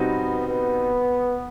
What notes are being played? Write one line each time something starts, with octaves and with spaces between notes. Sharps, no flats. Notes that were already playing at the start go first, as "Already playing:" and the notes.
Already playing: B2 G3 B3 C4 D#4 F#4
B3